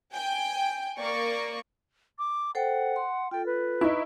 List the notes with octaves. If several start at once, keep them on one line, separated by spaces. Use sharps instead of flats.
G5 G#5
A#3 D5 C#6
D6
A4 C5 F#5 G5
C6
F4 A4 G5
B4
D#4 E4 C#6